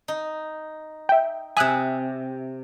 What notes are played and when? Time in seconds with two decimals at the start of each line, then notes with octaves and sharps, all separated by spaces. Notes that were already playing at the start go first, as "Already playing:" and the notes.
0.08 D#4
1.09 E5 G5
1.57 C3 E5 G#5 D#6 F#6